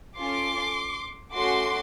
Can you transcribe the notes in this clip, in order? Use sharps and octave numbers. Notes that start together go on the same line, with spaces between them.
C#4 F4 A4 C6 D6
A3 C#4 F#4 C6 D6